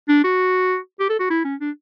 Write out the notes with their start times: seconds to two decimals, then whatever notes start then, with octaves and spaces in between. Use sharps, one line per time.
0.09 D4
0.24 F#4
1.00 G4
1.10 A4
1.20 F#4
1.30 E4
1.45 C#4
1.60 D4